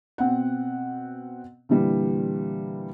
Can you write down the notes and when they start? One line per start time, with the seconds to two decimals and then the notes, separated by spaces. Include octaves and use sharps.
0.18 B2 C4 F#5
1.69 A#2 D3 E3 G3